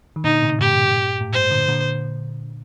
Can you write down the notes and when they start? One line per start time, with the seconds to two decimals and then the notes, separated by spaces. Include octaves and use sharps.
0.16 D#3
0.24 A#2 D3 D#4
0.42 A2 C3
0.59 G2 A#2 G4
1.21 A2
1.33 G2 C5
1.50 A#2 D3
1.68 A#2 D3